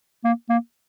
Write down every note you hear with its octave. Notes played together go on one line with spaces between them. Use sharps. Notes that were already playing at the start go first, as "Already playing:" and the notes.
A#3
A#3